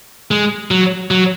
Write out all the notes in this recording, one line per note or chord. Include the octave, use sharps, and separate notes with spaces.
G#3
F#3
F#3